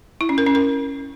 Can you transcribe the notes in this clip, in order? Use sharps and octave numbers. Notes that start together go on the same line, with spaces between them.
E4
C#4
A#4
C#4
A#4